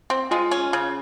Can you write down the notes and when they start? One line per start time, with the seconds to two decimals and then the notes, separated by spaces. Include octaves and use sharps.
0.10 C4
0.31 G#3 F4
0.51 C#4
0.73 C#3